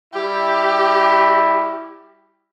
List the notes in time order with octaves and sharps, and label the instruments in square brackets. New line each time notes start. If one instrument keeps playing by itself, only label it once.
[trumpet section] G3 E4 [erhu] G4